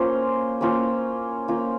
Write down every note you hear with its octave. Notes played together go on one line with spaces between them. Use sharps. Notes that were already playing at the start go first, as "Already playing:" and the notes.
Already playing: A#3 C#4 F4 C5
A#3 C#4 F4 C5
A#3 C#4 F4 C5